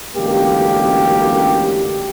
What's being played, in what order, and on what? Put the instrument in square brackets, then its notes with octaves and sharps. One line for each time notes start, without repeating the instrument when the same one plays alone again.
[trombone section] A1 F#2 D3 G#3 A#3 G4